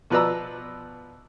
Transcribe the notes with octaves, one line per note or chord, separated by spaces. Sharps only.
B2 F3 B4 D5 A#5 E6